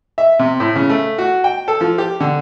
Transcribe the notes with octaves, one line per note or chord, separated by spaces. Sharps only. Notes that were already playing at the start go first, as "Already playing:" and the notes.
E5
C3
A2
C#3
A3
F#4
G5
A4
F3
G4
D3